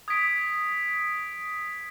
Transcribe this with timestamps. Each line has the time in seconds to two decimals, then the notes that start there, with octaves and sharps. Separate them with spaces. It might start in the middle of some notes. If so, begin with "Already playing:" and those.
0.08 D#6 G#6 B6 D7